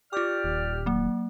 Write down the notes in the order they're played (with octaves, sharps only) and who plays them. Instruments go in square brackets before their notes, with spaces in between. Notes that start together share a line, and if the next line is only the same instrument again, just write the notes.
[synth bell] F4 D6 [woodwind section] G4 D5 F6
[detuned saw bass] D#1
[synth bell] F#3 A#3